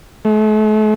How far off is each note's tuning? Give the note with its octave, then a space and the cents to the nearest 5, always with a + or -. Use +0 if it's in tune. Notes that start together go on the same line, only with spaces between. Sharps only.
A3 -40